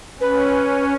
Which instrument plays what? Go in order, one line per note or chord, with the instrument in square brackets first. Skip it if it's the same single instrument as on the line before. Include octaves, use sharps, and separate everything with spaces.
[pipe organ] C#4 [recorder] B4